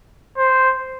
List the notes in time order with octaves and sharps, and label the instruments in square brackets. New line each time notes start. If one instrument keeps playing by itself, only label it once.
[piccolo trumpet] C5